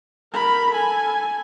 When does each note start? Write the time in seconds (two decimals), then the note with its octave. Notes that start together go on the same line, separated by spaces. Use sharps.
0.33 A#4 B5
0.71 A4 G#5